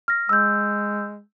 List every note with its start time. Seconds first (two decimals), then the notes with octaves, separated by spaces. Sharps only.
0.08 F6 A#6
0.29 G#3 E6 G6